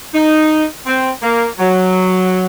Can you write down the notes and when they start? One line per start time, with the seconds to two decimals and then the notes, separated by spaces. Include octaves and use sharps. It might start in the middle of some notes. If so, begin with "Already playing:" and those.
0.14 D#4
0.86 C4
1.22 A#3
1.59 F#3